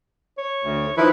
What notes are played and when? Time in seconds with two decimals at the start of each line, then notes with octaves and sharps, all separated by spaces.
0.38 C#5
0.63 D2
0.97 D#3 F3 E4 B4